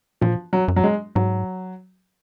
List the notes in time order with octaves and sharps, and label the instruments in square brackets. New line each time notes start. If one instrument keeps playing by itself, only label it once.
[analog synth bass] A#2 [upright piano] F3
[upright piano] F#3
[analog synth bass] F#2
[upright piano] F#3
G#3
[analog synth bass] G#2 [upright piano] F#3